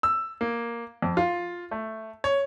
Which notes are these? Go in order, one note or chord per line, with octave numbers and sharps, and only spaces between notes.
E6
A#3
F2
F4
A3
C#5